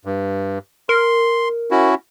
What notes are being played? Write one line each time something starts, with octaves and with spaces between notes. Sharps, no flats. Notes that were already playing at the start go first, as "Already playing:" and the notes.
G2
A#4 C6
C#4 E4 F#4